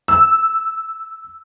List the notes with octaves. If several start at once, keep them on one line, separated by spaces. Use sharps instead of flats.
E6